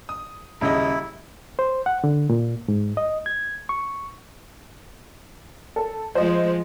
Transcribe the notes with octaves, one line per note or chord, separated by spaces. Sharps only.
D#6
D#1 C#3 E4 D#5
C5
F#5
D3
A#2
G#2
D#5
G#6
C#6
A4
F3 G#3 C5 D#5